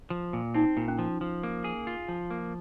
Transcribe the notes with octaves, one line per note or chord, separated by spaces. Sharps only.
F3
A#2
C4 D#4
A#2
C#4
F3
F3
A#3
G#4
F4
F3
A#3